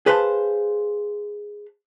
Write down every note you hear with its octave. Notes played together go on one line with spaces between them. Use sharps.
G#4 B4 C5 F5 A5